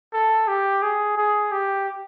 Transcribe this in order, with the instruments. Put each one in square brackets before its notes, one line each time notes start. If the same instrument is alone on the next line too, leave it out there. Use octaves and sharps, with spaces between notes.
[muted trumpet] A4
G4
G#4
G#4
G4